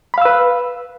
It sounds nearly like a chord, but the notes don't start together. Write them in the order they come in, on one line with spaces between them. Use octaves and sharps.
B5 F5 E6 B4